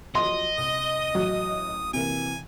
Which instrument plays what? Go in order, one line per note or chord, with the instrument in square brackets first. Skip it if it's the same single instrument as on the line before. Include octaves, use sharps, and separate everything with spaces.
[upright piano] F3 F#3 [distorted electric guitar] D#5 [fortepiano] C6
[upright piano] C2 [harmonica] D#6
[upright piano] A1 [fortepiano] F#3
[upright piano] C3 E3 A#3 [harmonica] G#5